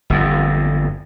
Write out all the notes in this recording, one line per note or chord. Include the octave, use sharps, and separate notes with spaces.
G1 F2